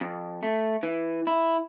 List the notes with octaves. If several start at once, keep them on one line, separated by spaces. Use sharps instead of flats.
F2
A3
E3
E4